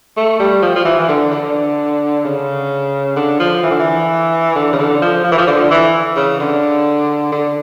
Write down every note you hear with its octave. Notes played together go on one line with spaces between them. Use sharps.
A3
G3
F3
F3
E3
E3
D3
D3
C#3
D3
F3
E3
D3
E3
D3
C#3
D3
F3
F3
E3
F3
D3
E3
C#3
D3
D3